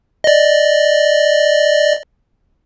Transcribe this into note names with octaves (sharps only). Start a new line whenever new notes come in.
D5 D#5